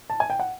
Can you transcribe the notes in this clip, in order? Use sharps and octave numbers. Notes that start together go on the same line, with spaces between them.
A5
G#5
G5
F#5